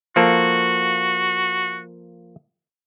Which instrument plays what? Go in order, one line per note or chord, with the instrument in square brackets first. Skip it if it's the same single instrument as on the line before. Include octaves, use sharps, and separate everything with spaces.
[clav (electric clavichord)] F3 A#3 A4 [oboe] F#4